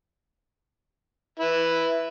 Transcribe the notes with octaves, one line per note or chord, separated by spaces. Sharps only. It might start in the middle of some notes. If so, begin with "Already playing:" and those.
E4 B4